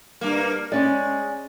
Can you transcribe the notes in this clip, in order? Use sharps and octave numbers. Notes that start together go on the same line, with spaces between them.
G2 A#3
G#3 C#4 D5